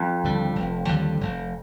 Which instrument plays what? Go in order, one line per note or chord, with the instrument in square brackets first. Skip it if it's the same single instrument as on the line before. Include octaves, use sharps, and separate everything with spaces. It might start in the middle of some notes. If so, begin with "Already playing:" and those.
Already playing: [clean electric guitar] F2
[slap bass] D#2 D3 G3
F1
D#2 D3 G3
F1